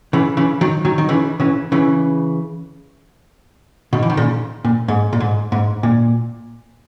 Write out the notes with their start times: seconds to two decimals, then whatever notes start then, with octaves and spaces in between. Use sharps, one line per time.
0.13 C#3 E3
0.37 C#3 E3
0.61 D#3 F#3
0.85 D#3 F#3
0.98 D#3
1.09 C#3 E3
1.40 C#3 E3
1.72 C#3 E3
3.93 B2 D#3
4.03 E3
4.10 D#3
4.17 A#2 C#3
4.65 A#2
4.88 G#2
5.13 A#2
5.20 G#2
5.52 G#2
5.83 A#2